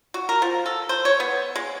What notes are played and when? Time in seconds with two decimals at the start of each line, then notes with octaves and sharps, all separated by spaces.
0.14 F#4
0.29 A#4
0.42 F3
0.66 A4
0.89 C5
1.05 C#5
1.20 B3
1.56 G#3